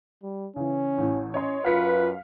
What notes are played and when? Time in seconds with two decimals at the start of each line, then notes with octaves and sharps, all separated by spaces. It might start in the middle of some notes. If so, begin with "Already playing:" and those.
0.23 G3
0.56 C#3 E3 C#4
0.98 A1 A2
1.34 C#4 C#5 D#5 C6
1.64 F#2 F4 B4 F5 B6 C#7